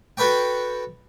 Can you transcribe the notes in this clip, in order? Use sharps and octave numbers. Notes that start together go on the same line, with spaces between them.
F#4 A4 B4 C#5 G5